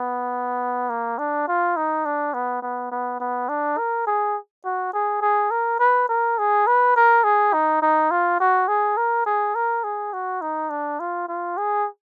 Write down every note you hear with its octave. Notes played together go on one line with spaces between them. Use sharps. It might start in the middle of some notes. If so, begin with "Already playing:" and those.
Already playing: B3
A#3
D4
F4
D#4
D4
B3
B3
B3
B3
D4
A#4
G#4
F#4
G#4
G#4
A#4
B4
A#4
G#4
B4
A#4
G#4
D#4
D#4
F4
F#4
G#4
A#4
G#4
A#4
G#4
F#4
D#4
D4
F4
F4
G#4